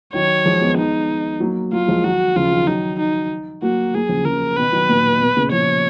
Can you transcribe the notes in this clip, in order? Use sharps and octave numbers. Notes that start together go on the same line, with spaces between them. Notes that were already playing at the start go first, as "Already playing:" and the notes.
D#3 F#3 C#5
F3 G#3
G#3 B3
D#4
F#3 A#3
F#3 A#3 F4
F3 G#3
D#3 F#3 F#4
C#3 F3 F4
D#3 F#3
D#3 F#3 D#4
D#4
F#3 A#3 F#4
F#3 A#3 G#4
C#3 F3
C#3 F3 A#4
B2 D#3 B4
D#3 F#3
A#2
B2
A#2 C#3
C#3 F3 C#5